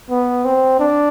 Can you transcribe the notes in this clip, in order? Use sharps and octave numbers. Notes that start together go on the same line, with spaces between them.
B3
C4
D4